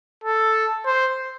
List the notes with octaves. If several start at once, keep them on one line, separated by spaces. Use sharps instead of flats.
A4
C5